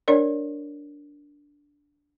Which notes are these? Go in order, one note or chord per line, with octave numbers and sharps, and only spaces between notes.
D4 A#4 C#5 D5